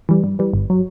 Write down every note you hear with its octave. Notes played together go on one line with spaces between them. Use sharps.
E3 G3
G2
E3 G3
G1
F#3